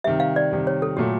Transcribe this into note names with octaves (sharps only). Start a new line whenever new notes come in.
C3 D#3 G3 E5
F5
D5
C3 D#3 G3
C#5
A4
A#2 F#3 A3 G4